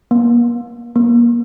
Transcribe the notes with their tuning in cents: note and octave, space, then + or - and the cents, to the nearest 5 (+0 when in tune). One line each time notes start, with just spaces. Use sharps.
A#3 +40
A#3 +25